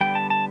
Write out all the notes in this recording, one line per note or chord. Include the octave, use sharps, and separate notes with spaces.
D3 G3 B3 G5
A5
A5